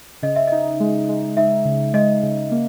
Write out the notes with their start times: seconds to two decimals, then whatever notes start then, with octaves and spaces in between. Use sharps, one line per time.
0.23 C#3 D#5
0.36 E5
0.48 D#4 D#5
0.80 G#3
1.09 G#3
1.37 D#4 E5
1.65 C#3
1.93 G#3 D#5
2.23 C#3
2.51 A#3